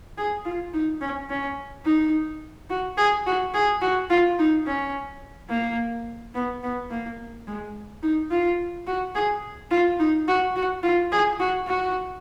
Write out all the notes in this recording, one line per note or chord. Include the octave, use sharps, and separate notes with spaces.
G#4
F4
D#4
C#4
C#4
D#4
F#4
G#4
F#4
G#4
F#4
F4
D#4
C#4
A#3
B3
B3
A#3
G#3
D#4
F4
F#4
G#4
F4
D#4
F#4
F#4
F4
G#4
F#4
F#4